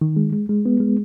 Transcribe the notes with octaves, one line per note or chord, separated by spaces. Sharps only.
D#3
G#3
G#3
G#3
B3
G#3